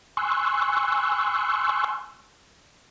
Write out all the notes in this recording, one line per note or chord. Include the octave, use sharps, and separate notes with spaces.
G#5 C6 C#6 E6 F#6